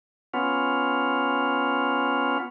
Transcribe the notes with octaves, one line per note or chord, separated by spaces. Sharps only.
B3 C#4 F4